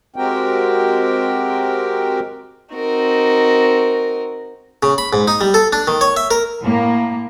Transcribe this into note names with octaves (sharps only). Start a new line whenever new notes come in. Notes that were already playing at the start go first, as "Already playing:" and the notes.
G#3 C4 F#4 G4 A#4 G5
C4 D#4 F#4 A#4
C#3
B5
G#2
D#4
G3
A4
D4
D#3
C#5
E5
A#4
A2 A#3